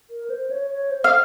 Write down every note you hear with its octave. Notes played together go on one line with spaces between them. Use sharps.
A#4
C5
C#5
C#5
C5
F5